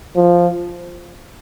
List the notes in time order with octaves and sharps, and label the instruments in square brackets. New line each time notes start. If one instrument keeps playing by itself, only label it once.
[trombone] F3